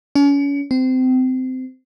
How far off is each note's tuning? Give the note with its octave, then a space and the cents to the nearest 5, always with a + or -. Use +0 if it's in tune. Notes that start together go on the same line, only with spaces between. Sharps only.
C#4 +35
C4 -25